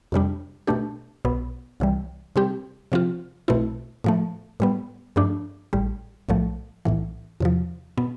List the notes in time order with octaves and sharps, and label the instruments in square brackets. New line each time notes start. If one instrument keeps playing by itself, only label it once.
[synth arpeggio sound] F2 C3 G3 D4
B2 A3 D4 G4
B1 B2 B3
C2 C3 E3 G3
C3 G3 C4 G4
C3 F3 C4 F4
B1 B2 A3 C4 E4
A2 F3 A3
A2 G3 B3
G2 F3 A3 D4
A1 A2 G3
B1 A2 F3 A3
B1 A2 E3
E2 C3 F3
B2 B3